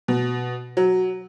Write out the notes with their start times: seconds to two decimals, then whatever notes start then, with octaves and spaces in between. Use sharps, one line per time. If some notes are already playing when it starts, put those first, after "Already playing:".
0.08 B2
0.77 F#3